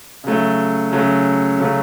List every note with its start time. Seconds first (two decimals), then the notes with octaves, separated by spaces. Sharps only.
0.24 C#3 F#3 A3
0.92 C#3 F#3 A3
1.59 C#3 F#3 A3